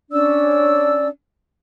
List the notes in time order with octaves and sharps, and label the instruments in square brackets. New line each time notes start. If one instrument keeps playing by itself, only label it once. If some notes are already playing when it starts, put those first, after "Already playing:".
[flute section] C#4 D4 D5 E6